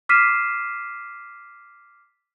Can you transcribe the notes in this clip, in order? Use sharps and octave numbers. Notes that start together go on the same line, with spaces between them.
D6 F6 B6 C7 D#7 E7